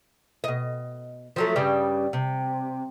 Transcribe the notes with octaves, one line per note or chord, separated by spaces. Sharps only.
B2 D#5
F3 F#3 A3
G2 C#3 G3
C3